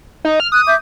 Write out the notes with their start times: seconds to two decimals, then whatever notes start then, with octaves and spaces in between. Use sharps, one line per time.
0.25 D#4
0.40 F6
0.52 D#6 F#6
0.67 E5 D6 G6